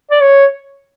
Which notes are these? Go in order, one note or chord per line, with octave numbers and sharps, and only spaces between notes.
D5
C#5